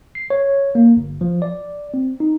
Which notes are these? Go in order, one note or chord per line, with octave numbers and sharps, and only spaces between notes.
C7
C#5
A#3
G1
F3
D5
C4
D#4